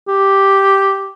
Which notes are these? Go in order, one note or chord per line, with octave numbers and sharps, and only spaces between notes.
G4